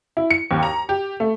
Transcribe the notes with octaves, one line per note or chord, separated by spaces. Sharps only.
E4
C#7
D#2
A#5
G4
A3